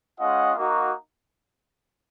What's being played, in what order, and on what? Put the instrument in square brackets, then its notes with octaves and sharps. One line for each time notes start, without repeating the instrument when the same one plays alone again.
[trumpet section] G#3 C#4 F4 D#5 F#5
A#3 D#4 F#4